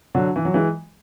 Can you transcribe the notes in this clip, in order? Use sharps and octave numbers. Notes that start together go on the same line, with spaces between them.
D3 F#3
E3
F#3
E3 G#3